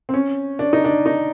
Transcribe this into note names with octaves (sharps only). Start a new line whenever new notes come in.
C4
C#4
D4
D#4
D4
D#4